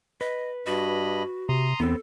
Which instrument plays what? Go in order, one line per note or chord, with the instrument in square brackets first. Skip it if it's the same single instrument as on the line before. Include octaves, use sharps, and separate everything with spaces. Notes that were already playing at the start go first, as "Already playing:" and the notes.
[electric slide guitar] B4 [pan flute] D#5
[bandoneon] G2 D#5 B5 [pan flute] F#4
[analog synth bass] C3 [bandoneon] A#5 C6 D#6
[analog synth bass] E2 [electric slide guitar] B3 C4 [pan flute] A4